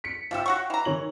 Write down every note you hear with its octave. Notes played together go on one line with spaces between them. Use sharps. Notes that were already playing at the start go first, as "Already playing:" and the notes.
B6 C#7
F3 G4 E5 F5 G5 E6
F#4 F#5 C#6
E3 A#5
D#3 C#5 F#7